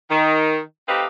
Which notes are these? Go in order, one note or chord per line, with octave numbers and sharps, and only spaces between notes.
D#3
A3 C4 D#4 G4 B4 F5